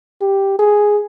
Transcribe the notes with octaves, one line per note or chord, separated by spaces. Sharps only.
G4
G#4